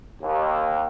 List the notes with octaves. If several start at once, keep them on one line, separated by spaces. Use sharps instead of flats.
D#2